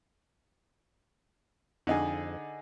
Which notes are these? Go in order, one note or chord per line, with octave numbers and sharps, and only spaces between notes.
F2 D3 D#4 G#4